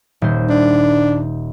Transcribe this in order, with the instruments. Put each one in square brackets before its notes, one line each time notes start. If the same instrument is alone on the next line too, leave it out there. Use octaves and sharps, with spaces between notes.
[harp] D#1 C5
[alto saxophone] D4